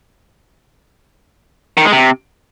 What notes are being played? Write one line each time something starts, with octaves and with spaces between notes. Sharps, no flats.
D#3
G#3
C3